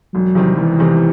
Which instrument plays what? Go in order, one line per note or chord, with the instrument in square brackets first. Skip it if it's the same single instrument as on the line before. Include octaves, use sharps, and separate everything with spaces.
[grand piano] E1 [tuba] F#3
[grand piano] E2 C3 D#3 G3
[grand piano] E1 [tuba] E3
[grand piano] E2 C3 D#3 G3